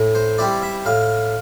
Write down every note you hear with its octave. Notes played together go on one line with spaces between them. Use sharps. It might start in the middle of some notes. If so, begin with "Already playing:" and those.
Already playing: A2
C5
G3 C4 E4 D5
E5
A2 F5